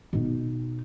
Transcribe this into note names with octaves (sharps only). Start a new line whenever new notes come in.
B2 D#4